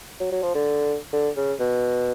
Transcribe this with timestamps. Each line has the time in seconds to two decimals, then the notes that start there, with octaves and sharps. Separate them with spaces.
0.20 F#3
0.32 F#3
0.43 F3
0.55 D3
1.13 D3
1.36 C#3
1.60 B2